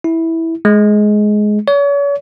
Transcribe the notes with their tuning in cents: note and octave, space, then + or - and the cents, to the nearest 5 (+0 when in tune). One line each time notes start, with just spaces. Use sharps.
E4 -10
G#3 +15
C#5 +40